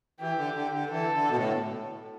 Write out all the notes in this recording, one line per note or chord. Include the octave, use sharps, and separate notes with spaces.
E3 G4
D3
D3
D3
E3 A4
D3
B2
A2